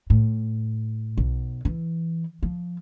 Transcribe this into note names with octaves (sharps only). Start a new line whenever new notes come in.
A2
B1
E3
F3